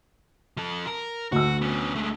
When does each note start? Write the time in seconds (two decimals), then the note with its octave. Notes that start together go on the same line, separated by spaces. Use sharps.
0.57 F3 A4
0.87 A#4
1.32 D2 F#4 E6
1.62 B3 C#4
1.95 G#3 A3